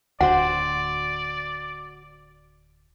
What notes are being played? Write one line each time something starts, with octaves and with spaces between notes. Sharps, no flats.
D1 G#1 D2 F#4 C5 D5 F#5